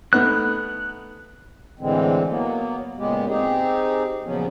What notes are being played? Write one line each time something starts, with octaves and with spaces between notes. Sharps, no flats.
A3 B3 D#4 F#6
A2 D3 E3 G#3 C4
F#3 A#3 B3
A#2 C#3 G#3 B3 G4
C4 D#4 G4 G#4
A#2 C#3 F3 F#3 B3 C#4